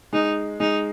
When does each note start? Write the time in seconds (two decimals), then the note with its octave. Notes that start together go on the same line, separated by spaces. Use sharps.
0.13 G#3 D#4
0.60 G#3 D#4